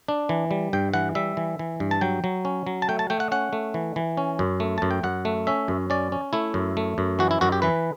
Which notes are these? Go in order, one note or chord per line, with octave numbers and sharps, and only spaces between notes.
D4
E3
G3
G2 G5
E3 F#5
G3 E5
E3
E3
G2
A5
F#3 G5
F#3
C#4
F#3
A5
A3 G5
A5
A3 G5
F#5
C#4 F#5
A3
E3
E3
C#4
F#2
A3
F#2 A5
G5
F#2 F#5
A3
C#4 E5
F#2
C#4 D5
C#4
A3 E4
F#2
A3
F#2
E3 F#4
E4
F#2 F#4
G4
E3 B4